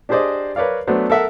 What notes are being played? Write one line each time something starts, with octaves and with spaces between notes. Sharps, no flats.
D4 G4 G#4 C5 D5 D#5
A#4 B4 C#5 D5 F5
F#3 A3 B3 D4 C5
A4 A#4 E5 F#5